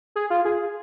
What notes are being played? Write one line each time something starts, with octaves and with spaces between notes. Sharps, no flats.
G#4
F4
G#4